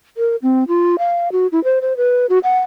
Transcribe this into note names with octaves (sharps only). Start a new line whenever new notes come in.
A#4
C4
F4
F5
F#4
E4
C5
C5
B4
F#4
F#5